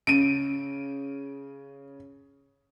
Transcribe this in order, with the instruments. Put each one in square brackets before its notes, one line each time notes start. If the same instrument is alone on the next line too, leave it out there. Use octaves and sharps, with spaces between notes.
[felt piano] C#3 [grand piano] D7 D#7